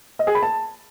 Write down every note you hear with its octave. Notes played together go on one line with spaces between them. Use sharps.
D#5
G#4
B5
A5